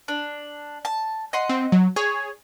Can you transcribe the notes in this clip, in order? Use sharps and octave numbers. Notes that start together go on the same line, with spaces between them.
D4
A5
D#5 F#5 C6
C4
F#3
G#4 C#5